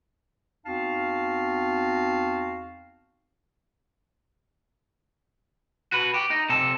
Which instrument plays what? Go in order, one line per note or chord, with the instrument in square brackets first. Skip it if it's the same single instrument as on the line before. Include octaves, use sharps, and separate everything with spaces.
[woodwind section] E2 C4 D#4 F#4 F5 A5
[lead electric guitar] F#4 B4
G4
D#4
C3 A4